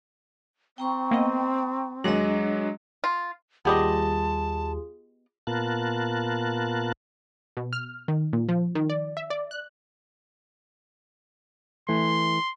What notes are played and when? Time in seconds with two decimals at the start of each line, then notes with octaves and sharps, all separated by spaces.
0.78 C4 G5 A#5 C#6
1.11 A#3 B3 D#5
2.04 D#2 F#3 G#3 D4 D#5 A#6
3.04 F4
3.65 D#2 G3 B3 F4 G4 G#4 D#5 A5
5.47 A#2 B3 F4 A#4 A5 F#6
7.57 B2
7.73 F6
8.08 D#3
8.33 A#2
8.49 F3
8.75 D#3
8.90 D5
9.17 E5
9.30 D5
9.51 F#6
11.89 E3 A3 C6